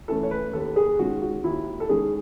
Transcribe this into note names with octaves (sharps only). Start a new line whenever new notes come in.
E3 A3 C#4 A4
C#5
B4
D#2 A4
G#4
D#3 G#3 C#4 F#4
F#4
D#2 E4
A4
D#3 G#3 C#4 G#4